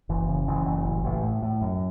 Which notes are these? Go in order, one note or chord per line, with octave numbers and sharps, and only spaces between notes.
F#1 E3
C#3
F#1 E3
F#1
A1
A1
A2
A2
F#2